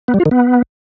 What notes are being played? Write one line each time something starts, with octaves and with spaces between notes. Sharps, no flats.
B3
G3
F4
D#3
B3